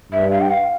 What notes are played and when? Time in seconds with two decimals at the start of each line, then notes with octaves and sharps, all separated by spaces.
0.12 G2 E5
0.31 F5
0.41 G5
0.50 F5